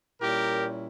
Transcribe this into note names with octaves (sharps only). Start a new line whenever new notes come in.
A#2 G3 C#4 E4 G4 A#4